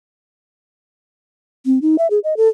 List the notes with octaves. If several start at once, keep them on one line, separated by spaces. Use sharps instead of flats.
C4
D#4
E5
G#4
D#5
A4